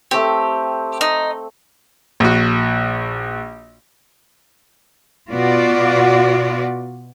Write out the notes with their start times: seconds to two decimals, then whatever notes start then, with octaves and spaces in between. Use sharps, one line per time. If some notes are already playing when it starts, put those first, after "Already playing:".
0.11 A3 C4 G4
1.01 D#4
2.20 A#1 F#4
5.31 B2 B3 F4 F#4 D5